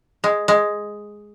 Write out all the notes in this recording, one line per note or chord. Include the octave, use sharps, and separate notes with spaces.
G#3
G#3